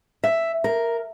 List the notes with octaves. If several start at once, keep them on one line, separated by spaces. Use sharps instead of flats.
E5
A#4